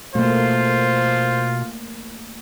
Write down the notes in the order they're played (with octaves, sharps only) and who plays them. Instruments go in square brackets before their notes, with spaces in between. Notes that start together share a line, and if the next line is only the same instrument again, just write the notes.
[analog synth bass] B2 [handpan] A3 A#3 [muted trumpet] F4 [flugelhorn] C5